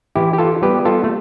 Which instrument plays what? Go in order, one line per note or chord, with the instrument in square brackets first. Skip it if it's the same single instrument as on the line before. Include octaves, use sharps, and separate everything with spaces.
[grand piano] E3 [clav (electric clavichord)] E4 G4
[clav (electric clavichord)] G4
F4 A4
[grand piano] G3 B3 [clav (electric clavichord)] G4 B4
[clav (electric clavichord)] F4 A4
A3